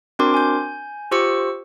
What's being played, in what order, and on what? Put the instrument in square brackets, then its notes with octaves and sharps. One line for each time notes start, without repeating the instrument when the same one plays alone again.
[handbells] C4 D4 F#4 A#4 C6 D6
G#5 G6
F4 G4 C5 C#6 E6 C#7